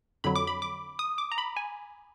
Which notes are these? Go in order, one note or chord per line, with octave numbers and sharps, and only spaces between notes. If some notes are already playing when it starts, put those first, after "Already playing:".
F2 D3 F#3 B5
D6
B5
D6
D#6
D6
A#5
B5
G#5